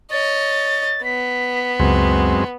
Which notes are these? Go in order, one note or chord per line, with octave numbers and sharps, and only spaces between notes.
C#5 D#5 A6
B3 B6
C#2 F#2 G#3 C4